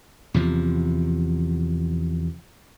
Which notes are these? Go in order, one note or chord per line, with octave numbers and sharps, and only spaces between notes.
E2 C3 F3